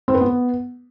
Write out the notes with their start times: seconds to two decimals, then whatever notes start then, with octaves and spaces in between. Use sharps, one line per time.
0.08 C4
0.14 B4
0.21 B3